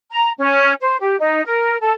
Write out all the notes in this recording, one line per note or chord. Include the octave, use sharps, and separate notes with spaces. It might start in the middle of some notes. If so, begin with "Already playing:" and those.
A#5
C#4
C5
G4
D#4
A#4
A4